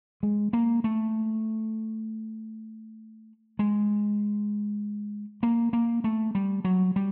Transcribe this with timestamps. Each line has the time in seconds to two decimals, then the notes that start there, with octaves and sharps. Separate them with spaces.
0.23 G#3
0.53 A#3
0.84 A3
3.59 G#3
5.43 A#3
5.73 A#3
6.04 A3
6.35 G3
6.64 F#3
6.96 G3